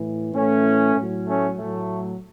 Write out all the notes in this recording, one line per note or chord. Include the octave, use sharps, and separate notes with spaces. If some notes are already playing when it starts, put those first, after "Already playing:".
Already playing: A2 E3
A2 E3 A3 C#4
A2 F#3
A3 C#4
A2 F#3 A3